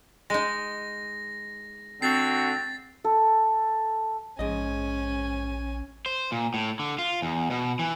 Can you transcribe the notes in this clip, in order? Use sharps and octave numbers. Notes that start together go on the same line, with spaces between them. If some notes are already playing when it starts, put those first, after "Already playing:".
G#3 D#4 A#6
D3 C4 F#4 A6 C7
A4
A#1 G#2 C#4 D#5 G#5
C5
A#2
A2
D3
F4
E2
B2
E3